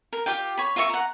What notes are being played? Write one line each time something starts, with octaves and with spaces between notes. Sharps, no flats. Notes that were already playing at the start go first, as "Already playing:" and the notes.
A#4
F4 G4 F5 G5
C#5 B5
F4 A#4 E5 C#6
F#5 A#5